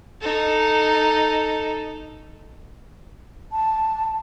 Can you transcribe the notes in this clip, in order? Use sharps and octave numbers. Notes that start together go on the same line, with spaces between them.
D#4 A4
A5